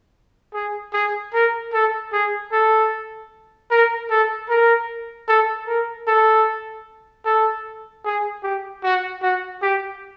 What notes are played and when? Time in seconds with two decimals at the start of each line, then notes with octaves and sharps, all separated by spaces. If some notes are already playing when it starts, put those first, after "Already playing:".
0.54 G#4
0.93 G#4
1.34 A#4
1.73 A4
2.13 G#4
2.52 A4
3.71 A#4
4.10 A4
4.49 A#4
5.28 A4
5.67 A#4
6.07 A4
7.25 A4
8.05 G#4
8.43 G4
8.83 F#4
9.23 F#4
9.62 G4